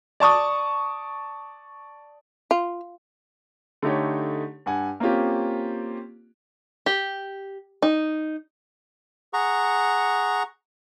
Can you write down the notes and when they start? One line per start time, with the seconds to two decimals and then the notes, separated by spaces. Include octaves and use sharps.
0.20 D5 A5 C#6 D#6
2.51 F4
3.82 D3 A3 D#4 G4 C#5
4.66 G2 F#5 G#5
5.00 A#3 C4 C#4 F4 G4
6.86 G4
7.82 D#4
9.33 G#4 F#5 A#5 C#6